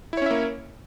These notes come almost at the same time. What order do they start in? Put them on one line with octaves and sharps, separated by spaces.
E4 C#5 C#4 E5 A#3